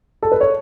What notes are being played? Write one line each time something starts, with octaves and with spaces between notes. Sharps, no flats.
A4
B4
C#5